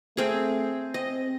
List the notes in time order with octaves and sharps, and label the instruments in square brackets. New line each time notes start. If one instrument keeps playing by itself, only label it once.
[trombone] A3 [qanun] C4 G#4
[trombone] C4 [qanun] D#5